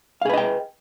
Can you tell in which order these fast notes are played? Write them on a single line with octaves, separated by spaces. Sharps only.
F5 G#4 B4 D#5 G5